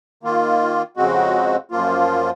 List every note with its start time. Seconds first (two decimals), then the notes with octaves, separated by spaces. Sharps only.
0.23 D#3 A#3 F4
0.97 F2 C#3 G#3 C4 F#4
1.71 F#2 F3 A#3 F4